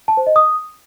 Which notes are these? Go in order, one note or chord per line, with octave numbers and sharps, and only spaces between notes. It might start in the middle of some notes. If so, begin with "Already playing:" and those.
A5
C5
D#5
D#6